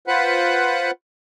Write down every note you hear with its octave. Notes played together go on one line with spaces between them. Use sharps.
F4 B4 C5 F#5 B5 F#6